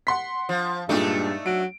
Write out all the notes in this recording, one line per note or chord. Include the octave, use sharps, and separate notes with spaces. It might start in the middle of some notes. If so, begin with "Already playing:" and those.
F#5 C6 B6
F3
G2 A#2 G#3 A3 D4 D#4
F#3 D7